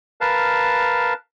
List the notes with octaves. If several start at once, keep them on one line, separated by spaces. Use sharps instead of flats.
A#4 B4 F5 A5